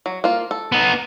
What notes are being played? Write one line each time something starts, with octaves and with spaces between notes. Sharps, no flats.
F#3
A#3 F4
A4
B3 D#4